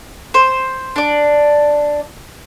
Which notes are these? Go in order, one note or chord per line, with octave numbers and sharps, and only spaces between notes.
C5
D4 D5